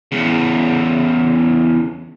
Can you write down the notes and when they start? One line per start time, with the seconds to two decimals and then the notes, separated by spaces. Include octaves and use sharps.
0.12 E2 C#3